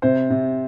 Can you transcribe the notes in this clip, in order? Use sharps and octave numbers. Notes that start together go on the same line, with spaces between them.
C3 C5
C3